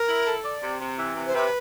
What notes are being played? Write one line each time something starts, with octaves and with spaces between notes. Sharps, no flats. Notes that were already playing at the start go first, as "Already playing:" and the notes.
Already playing: A#4
E4
A4
D5
C3
C3
E3
C3
C5
C3 B4